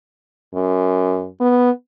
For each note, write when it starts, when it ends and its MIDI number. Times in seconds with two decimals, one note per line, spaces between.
0.55 1.27 42
1.41 1.70 59